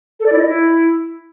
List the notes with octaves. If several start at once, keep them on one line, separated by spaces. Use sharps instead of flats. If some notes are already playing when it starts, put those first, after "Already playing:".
A4
D5
E4
D#5
E4